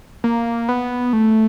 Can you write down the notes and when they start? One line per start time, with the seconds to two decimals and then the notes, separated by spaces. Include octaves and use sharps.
0.24 A#3
0.69 B3
1.13 A3